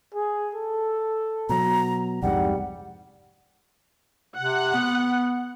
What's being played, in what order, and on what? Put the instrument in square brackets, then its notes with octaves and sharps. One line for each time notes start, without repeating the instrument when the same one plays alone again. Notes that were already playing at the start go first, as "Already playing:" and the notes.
[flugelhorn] G#4
A4
[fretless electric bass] B2 F#3 [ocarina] A#5
[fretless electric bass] C2 F2 G#2 [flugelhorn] G3 [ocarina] F#5
[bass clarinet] C3 [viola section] F#5
[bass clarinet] B3